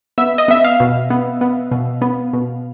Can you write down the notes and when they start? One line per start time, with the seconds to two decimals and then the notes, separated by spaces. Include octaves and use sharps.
0.18 B3 E5
0.38 D#5
0.48 B3 E5
0.65 F5
0.80 B2
1.10 B3
1.41 B3
1.71 B2
2.02 B3
2.33 B2